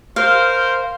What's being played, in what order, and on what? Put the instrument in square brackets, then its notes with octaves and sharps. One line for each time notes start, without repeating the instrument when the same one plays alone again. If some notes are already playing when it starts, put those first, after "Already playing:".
[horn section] A#4 C5 [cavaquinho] F5